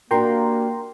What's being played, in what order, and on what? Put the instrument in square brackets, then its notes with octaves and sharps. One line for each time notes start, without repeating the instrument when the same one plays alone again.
[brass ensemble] A#3 [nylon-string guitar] D4 F#4 G4 [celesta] A#4 [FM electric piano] G5 A#5 C6